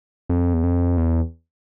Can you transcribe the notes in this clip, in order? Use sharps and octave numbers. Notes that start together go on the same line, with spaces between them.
F2
E2
F2
E2